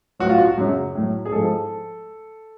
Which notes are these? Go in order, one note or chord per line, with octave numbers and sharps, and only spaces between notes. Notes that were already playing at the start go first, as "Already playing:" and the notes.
A2 F#3 F#4
F4
F#4
F#2 C#3 F#3
A2 F#3
G#4
G#2 F3 A4